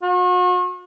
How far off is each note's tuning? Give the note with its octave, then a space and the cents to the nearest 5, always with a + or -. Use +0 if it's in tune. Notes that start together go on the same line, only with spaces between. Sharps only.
F#4 -40